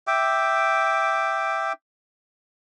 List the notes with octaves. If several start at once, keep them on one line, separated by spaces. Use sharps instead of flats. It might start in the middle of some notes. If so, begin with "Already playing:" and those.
E5 G5 D6